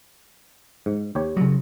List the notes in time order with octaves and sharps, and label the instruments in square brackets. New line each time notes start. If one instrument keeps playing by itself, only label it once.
[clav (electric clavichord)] G#2
D#2 G4 C#5
[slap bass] C#3 F#3